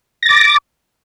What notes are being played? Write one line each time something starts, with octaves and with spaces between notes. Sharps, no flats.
D6 A6 A#6